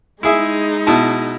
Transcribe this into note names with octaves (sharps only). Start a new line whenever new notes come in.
G#3 D#4 E4 G#4 E5
B2 E4 A5